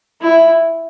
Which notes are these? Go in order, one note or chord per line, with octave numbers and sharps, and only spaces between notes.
E4